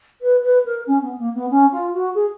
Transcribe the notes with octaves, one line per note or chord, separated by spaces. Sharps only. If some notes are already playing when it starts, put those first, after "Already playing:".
B4
B4
A#4
C#4
B3
A#3
B3
C#4
F4
F#4
G#4